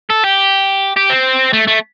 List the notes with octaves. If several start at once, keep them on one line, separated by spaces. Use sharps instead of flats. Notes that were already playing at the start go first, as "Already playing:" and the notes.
A4
G4
G4
C4
A3
A3